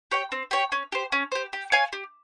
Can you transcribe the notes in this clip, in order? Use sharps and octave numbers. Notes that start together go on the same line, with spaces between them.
G4 C#5 G5
C4
G4 C#5 G5
C#4
G4 C5
C#4
G4 C5
G4
C#5 F5 G#5
G4